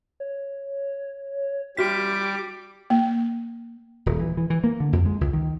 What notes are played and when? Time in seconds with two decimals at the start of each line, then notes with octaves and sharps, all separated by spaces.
0.20 C#5
1.77 G3 F#4 G4 D6 B6
2.90 A#3
4.06 D#1
4.20 E3
4.37 E3
4.50 E3
4.64 A#3
4.80 D3
4.93 F2
5.06 G#3
5.21 C#2
5.33 D#3